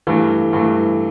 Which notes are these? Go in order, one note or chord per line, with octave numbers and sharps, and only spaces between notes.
G2 E3 A3
G2 E3 A3